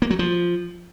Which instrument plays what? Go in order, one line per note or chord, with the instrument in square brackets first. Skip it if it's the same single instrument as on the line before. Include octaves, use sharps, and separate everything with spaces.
[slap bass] A#3
F#3
F3